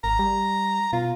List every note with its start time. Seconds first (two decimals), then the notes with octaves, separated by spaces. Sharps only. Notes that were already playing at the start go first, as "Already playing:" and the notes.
0.04 G#1 A#5
0.19 G3
0.93 B2 F4